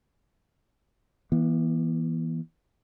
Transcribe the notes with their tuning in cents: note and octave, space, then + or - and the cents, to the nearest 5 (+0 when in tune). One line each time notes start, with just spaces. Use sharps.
E3 +0 B3 -40